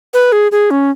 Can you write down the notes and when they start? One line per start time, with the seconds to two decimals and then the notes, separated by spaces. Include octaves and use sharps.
0.14 B4
0.32 G#4
0.52 G#4
0.71 C#4